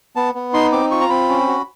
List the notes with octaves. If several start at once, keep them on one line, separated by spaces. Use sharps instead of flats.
B3 A5
B3
D#4 C6
C4 D6
F4 C#6
A#5
C4 B5
C#4
F#4